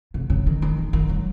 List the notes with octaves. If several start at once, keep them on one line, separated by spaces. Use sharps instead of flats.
C3
C#3
D#3
D#3
D#3
D#3
F#3